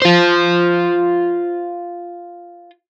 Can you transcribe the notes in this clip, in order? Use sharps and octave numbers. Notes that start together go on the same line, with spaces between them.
F4 C5